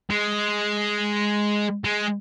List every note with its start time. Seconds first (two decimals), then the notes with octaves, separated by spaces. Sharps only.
0.10 G#3
1.84 G#3